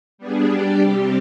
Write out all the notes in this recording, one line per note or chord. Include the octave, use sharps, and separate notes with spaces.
G3 B3 D4 G#4
G3 D4 G4 D5
C3 G3 C4 G4